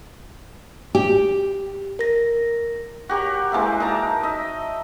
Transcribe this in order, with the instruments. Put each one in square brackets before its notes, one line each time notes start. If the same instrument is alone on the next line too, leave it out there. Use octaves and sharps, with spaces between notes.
[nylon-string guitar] G4
[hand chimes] A#4 A#6
[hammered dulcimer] F#4 G4 A#4 C#5
E3 G#3 A#3 E5
D#4 A#4 A5 A#5
D#5 E5